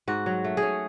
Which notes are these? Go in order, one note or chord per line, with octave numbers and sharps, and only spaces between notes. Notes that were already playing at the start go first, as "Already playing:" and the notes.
G#2 F#4
F#3
A3
G#4
C#4